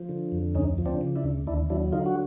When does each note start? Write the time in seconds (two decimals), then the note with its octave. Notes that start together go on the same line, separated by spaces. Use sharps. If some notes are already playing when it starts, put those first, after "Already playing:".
Already playing: F3
0.09 D3
0.32 F2
0.55 D2 C#4 D#4
0.78 F3
0.86 C4 D4
1.01 C#3
1.16 D4 E4
1.24 D2
1.47 D#2 D4 E4
1.70 F#3 D4 E4
1.92 D3 D#4 F4
2.06 F#4